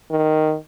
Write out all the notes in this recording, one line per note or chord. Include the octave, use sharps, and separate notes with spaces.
D#3